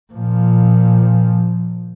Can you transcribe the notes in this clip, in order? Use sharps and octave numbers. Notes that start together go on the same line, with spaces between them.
A#2 F3